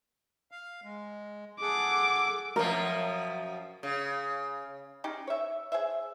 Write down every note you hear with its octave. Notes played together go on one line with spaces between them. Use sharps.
F5
G#3
G#4 A4 F#5 D6
F#2 B2 F3 A#4
C#3
C#4 D#4 G4 G#4
C#5 E5
G#4 C5 E5